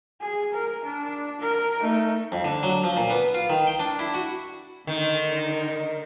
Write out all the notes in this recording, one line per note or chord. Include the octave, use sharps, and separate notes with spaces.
G#4
A#4
D4
A#4
A3 D#4
F2
D3
F#3
F3
A#2
B3
F4
D#3
G5
D4
E4
F#4
D3 D#3 D#4 A#4